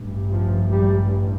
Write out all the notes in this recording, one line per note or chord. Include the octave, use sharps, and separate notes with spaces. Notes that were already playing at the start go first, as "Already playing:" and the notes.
Already playing: A1 G2
F3
G3